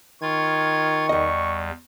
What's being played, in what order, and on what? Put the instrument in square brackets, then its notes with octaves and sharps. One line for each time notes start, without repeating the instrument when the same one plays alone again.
[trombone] D#3 [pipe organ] F4 G#6 [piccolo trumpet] C#6
[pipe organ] E2 [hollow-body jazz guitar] G3 D#5